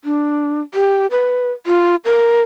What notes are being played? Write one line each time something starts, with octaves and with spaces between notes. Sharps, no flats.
D4
G4
B4
F4
A#4